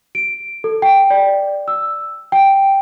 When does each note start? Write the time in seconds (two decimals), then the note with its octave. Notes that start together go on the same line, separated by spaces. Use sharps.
0.15 D7
0.64 A4
0.82 G5
1.10 D5
1.68 E6
2.32 G5